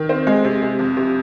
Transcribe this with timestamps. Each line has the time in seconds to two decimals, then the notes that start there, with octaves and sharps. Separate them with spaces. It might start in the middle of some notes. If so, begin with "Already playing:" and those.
Already playing: D#3
0.09 C4
0.27 G#3
0.45 C3
0.62 C3
0.79 F2
0.97 C3